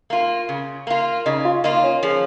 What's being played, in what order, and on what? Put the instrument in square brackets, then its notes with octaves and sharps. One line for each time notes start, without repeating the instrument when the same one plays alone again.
[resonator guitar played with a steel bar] A#3 F4
C#3
A#3 F4
[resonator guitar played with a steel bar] C#3 [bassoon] D#4
[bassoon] F4
[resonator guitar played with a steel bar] A#3 F4 [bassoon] D#4
[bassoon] C#4
[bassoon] C#3 [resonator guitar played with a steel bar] F3